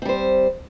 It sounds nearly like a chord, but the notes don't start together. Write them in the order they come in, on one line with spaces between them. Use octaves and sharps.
C4 G3 C5